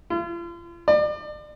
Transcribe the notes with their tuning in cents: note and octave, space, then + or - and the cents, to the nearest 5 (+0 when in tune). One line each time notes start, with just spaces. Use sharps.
F4 -40
D5 +35